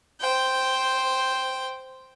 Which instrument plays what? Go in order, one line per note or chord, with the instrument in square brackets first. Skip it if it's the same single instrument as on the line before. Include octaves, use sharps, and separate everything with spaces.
[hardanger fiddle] C5 G5